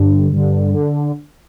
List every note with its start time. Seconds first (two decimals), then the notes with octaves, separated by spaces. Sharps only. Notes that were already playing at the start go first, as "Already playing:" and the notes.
Already playing: G2 D3
0.32 G2 D3
0.74 D3